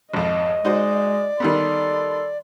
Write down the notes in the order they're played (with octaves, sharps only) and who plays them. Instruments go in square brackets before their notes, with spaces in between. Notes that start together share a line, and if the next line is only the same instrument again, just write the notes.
[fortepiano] G#1 F2 [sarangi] D#5
[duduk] G#3 [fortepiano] D#4 F#4 C5 [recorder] D5
[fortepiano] D#3 G3 B3 [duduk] A4 [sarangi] C6